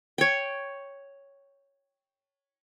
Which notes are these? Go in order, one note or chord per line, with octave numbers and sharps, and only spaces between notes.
C#5 G5